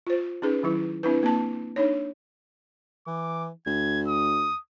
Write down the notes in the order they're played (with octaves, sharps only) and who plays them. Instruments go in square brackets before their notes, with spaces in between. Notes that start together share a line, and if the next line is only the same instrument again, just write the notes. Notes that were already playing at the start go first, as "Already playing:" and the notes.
[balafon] F4 C5
C#4 D#4 G#4 B4
D#3 F#3 E4
C4 D4 E4 B4
A#3 C4 A5
D4 D#4 C#5
[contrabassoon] E3 [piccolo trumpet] D6
[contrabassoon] D2 [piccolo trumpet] G#6
[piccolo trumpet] D#6